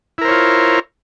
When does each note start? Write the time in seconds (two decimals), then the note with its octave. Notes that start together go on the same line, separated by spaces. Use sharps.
0.18 E4
0.21 A#4
0.25 C5
0.28 C#5
0.31 F4